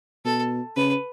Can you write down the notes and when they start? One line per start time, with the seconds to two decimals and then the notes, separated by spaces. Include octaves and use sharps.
0.25 B2 A4
0.76 C#3 B4